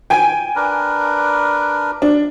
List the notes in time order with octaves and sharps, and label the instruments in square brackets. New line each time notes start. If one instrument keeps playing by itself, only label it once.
[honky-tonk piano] G5 G#5
[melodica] D4 A#4 B4
[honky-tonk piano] D4